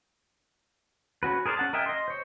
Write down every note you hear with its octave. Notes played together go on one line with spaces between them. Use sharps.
C#4 F#4 B4
G#4 A#4 C5 D5
C#4 F#5 A5
A#4 D#5 E5 G5 G#5
D#5 C6
C5 C#5